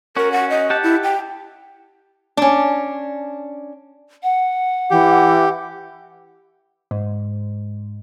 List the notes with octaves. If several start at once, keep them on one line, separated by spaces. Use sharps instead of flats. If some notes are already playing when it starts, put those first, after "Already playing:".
C#4 F#4 A#4
F#5
D#5
G4 F#5 A5
E4
G5
C#4 D4
F#5
E3 G4
G#2